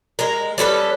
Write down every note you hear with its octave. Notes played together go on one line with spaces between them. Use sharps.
G#3 A#4
G3 C#4 A4 B4